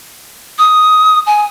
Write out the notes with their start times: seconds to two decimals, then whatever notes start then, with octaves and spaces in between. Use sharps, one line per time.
0.59 D#6
1.27 G#5